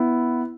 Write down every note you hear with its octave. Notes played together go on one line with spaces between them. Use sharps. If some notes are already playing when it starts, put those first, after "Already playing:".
Already playing: B3 E4